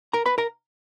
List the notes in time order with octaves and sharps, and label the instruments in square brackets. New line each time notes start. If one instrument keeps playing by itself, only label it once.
[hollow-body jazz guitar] A#4 A#5
B4 B5
A#4 A#5